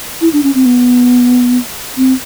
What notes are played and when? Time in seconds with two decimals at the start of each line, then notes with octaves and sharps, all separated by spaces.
0.21 E4
0.33 D4
0.43 C#4
0.55 C4
0.66 B3
1.97 C4